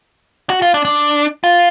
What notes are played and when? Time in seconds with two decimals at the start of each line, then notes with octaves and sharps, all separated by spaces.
0.50 F#4
0.62 F4
0.74 D4
0.85 D4
1.44 F4